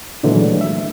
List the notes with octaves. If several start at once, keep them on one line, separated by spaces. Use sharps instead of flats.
A#2 D3 E3 F#3 G#3 A3
E5